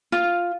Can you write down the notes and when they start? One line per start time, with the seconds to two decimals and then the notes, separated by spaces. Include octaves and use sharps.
0.12 F4